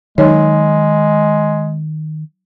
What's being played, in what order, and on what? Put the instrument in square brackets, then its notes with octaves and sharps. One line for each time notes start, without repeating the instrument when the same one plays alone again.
[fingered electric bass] D#3 [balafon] F#3 D#4 C#5 [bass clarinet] G#3